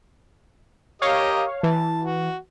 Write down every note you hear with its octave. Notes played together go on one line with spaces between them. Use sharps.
G4 A#4 C#5 D#5 F5
E3 A5
F#4